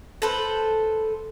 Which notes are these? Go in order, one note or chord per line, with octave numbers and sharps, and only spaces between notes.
A4 B4 C5